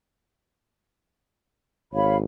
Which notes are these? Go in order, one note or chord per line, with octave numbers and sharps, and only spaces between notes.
G#1 C#5 F5 B5